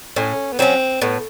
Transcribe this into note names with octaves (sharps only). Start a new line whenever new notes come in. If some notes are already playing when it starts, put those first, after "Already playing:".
A2 C#4
B3
F#3 A#3 C4 C#4
A2 B3